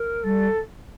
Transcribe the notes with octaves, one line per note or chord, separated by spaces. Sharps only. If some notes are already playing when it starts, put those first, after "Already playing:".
Already playing: A#4
G3 A4